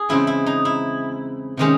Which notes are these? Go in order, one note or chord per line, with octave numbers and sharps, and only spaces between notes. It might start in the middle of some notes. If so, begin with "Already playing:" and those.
Already playing: G#4
E2 C#3 G#3 C4 E4
E4
D#4
E4
C3 D#3 G#3 C#4